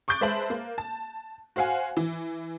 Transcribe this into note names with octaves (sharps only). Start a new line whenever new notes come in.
C#6 D6 F#6 G6 A6 D7
G#3 B4 C5 E5 A5 F#7
A#3
A5
F#4 C5 F5 F#5 G#5
E3